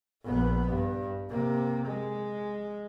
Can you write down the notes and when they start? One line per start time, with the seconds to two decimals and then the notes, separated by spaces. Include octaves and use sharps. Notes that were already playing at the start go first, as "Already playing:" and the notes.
0.23 A#1 B3
0.69 G2
1.30 C3 A#3
1.86 G#3